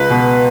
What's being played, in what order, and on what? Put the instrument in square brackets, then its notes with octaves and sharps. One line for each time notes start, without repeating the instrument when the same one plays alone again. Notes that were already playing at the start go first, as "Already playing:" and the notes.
Already playing: [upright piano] C#2 [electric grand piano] B4
[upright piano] B2